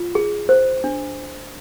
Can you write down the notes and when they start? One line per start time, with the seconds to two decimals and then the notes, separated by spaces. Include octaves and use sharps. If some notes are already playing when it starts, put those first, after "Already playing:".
Already playing: F4
0.15 G#4
0.49 C5
0.84 D4